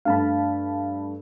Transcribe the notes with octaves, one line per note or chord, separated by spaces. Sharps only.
G2 A3 F5 A5 B5